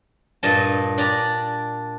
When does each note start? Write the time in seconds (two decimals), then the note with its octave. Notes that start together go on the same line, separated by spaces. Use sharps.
0.43 G2 A#2 D#5 A5
0.98 D4 G4 D5 G#5 A#5